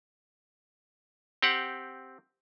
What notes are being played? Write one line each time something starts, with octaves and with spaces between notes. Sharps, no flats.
C4 G4 F#5